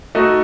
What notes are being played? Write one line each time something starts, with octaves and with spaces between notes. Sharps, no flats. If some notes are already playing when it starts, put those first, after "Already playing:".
A3 D#4 F#4